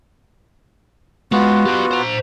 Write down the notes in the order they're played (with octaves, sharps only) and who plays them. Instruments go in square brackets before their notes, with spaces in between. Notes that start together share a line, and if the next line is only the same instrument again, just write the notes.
[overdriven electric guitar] G#3 [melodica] B3 F4 F#4
[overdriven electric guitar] G4 B4
C5 A#5